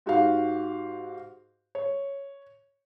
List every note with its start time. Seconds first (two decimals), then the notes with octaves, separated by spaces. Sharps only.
0.06 G#2 F#4 G4 F5
1.75 C#5